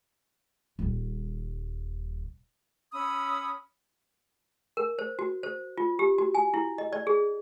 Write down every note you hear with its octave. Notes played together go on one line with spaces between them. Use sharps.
D#1 G3
C#4 B5 D#6 E6
A#4
C5
F#4
C5
F4
G4
F#4
G#5
E4
D#5
D5
G#4